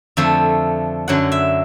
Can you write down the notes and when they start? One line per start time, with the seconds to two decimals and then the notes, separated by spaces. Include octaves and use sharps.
0.17 F2 D3 F3 A3 E5
1.08 F#2 D3 F#3 F#5
1.32 E5